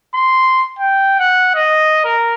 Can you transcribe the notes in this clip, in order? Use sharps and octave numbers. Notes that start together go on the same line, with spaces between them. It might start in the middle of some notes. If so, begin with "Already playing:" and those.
C6
G5
F#5
D#5
A#4